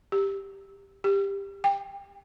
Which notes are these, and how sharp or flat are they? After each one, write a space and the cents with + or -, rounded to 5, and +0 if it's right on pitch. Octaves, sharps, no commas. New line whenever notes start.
G4 +5
G4 +15
G5 +20